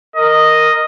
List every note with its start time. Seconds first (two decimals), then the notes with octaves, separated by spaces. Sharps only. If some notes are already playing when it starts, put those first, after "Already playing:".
0.16 A#4 D#5